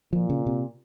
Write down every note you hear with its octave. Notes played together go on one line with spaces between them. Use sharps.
A#2 F3
C#3
C3